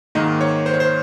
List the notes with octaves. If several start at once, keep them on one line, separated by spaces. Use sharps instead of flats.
G#2 D#3 A#3 D#5
C#5
C5
C#5
C5